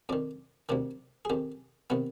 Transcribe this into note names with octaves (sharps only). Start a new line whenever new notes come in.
F2 D#3 D5
D2 C3 D#3 D5
G#4
F2 D#3 G4
C3 D#3 B3